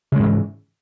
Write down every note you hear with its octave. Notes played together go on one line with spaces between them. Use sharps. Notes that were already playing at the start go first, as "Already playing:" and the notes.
G#2 C#3 E3 G#3